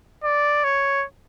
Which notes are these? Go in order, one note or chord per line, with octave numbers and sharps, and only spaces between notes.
D5
C#5